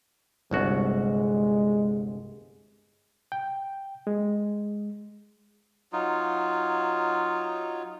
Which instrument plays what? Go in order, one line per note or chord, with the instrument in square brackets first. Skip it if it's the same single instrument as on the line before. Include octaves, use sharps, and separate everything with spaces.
[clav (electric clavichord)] G1 C2 F#4 [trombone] G#3
[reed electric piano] G5
G#3
[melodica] F#3 D#4 F4